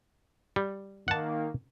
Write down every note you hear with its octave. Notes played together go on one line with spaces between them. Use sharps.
G3
D#3 A#3 F#5 A5